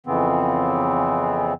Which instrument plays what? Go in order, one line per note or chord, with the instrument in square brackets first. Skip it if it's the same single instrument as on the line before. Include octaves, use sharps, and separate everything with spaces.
[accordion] F2 C#3 E3 B3 C4